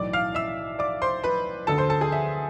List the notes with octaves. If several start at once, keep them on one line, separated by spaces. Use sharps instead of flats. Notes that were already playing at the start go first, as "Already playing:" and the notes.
Already playing: B1 A2 E3 D5 D6
F5 F6
E5 E6
D5 D6
C5 C6
B4 B5
D2 D3 A4 A5
C5 C6
A4 A5
G#4 G#5
E5